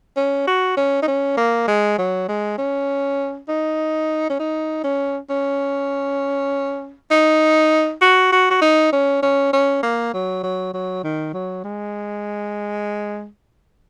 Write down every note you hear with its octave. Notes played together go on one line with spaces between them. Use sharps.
C#4
F#4
C#4
D#4
C#4
A#3
G#3
F#3
G#3
C#4
D#4
C#4
D#4
C#4
C#4
D#4
F#4
F#4
F#4
D#4
C#4
C#4
C#4
A#3
F#3
F#3
F#3
D#3
F#3
G#3